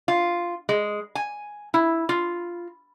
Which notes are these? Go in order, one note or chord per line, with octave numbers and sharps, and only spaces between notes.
F4
G#3
G#5
E4
F4